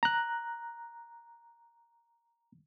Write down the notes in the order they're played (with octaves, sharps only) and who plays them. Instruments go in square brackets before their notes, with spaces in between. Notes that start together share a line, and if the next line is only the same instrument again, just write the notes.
[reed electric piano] A#5 F#6